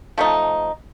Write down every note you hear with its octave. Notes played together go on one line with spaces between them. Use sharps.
F3 A3 D#4